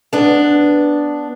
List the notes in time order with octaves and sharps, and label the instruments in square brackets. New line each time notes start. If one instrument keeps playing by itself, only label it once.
[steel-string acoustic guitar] B3 D4